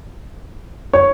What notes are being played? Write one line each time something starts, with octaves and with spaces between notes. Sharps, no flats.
C#5